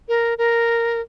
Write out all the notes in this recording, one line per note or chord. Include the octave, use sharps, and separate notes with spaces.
A#4
A#4